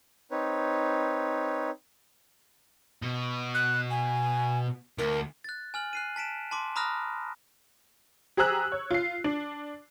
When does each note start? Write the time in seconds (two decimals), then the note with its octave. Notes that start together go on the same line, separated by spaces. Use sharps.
0.31 C4 D#4 B4 C#5
3.03 B2
3.55 F#6
3.90 G#5
4.99 D2 A#4
5.44 F#6 A6
5.74 G#5 F6 F#7
5.93 F#6 C7 D#7
6.16 A5 B6 D7 E7
6.51 A5 C6 D6
6.76 A#5 B5 D#6 F6 F#6 A#6
8.37 G4 G#4 C5 A#5 E6 F#6
8.72 C#5
8.91 F4 C7
9.24 D4